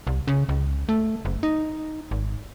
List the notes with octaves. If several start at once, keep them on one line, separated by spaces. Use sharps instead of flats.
C2
C#3
C#2
A3
F#1
D#4
G#1